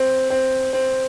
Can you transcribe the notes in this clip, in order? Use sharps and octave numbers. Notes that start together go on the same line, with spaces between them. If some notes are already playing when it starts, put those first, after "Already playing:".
Already playing: C4
C4
C4